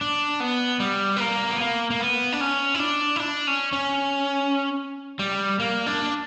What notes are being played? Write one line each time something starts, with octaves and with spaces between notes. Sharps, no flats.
D4
B3
G3
B3
A#3
B3
A#3
A#3
B3
D4
C#4
E4
D4
E4
D4
C#4
C#4
G3
A#3
D4